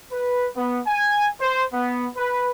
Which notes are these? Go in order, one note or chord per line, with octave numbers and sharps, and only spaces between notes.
B4
B3
G#5
C5
B3
B4